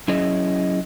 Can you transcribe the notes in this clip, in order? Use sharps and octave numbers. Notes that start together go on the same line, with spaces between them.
F#3 C#4 E4 G#4 D#5